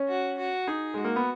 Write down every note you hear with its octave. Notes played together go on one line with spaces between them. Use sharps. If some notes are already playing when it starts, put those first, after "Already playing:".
Already playing: C#4
F#4
F#4
D#4 G#4
G#3 F#4
A#3
B3